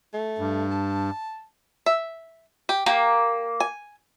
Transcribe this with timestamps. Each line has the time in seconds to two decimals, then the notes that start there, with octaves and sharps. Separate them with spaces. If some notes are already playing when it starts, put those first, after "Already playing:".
0.14 A3
0.39 G2
0.71 A5
1.86 E5
2.69 G4
2.86 A#3 G4
3.60 G#5